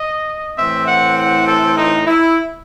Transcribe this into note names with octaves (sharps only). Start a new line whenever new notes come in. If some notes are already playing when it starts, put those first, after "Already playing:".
Already playing: D#5
A2 E3 A3 C4 E5
F#5
F#5
A4
D#4
E4